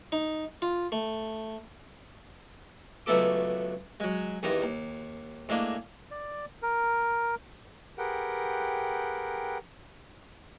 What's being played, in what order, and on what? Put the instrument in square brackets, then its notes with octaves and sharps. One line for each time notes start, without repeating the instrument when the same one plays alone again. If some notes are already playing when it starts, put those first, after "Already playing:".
[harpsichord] D#4
F4
A3
C#2 F#3 A3 B3 A4 D6
F#3 G#3
E2 G2 D#3 D#4 A#4
D#2
A2 G#3 A#3 D4
[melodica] D5
A#4
[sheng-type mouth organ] G4 G#4 A#4 B4 F#5 G5